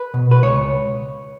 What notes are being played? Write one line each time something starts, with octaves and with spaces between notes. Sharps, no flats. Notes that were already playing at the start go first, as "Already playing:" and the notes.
Already playing: B4
B2
B4
C#2 C#5